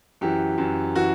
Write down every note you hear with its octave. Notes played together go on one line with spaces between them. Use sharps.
F#2 E3 G4
F#2 E3
E3 F#4